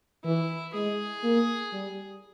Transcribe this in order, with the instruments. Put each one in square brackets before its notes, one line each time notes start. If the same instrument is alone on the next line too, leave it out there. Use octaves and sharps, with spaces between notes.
[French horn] E3 [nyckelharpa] E4
[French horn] G#3 [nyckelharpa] G#4
[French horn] A#3
G3